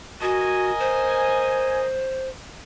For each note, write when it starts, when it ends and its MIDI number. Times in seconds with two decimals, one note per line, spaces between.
0.21 0.72 66
0.21 1.84 70
0.21 1.84 75
0.21 1.84 80
0.80 2.29 72